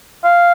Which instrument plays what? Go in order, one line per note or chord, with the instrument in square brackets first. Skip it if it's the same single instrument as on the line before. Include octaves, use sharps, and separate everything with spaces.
[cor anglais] F5